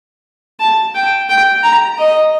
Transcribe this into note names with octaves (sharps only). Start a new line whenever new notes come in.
A5
G5
G5
A#5
D#5